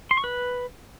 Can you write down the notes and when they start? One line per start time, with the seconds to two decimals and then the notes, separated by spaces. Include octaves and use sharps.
0.11 C6
0.17 C#6
0.24 B4